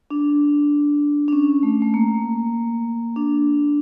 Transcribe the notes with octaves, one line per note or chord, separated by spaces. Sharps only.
D4
D4
C#4
A3
A3
A#3
D4